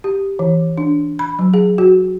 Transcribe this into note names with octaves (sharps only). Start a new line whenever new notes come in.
G4
E3
D4
B5
F#3
G#4
F#4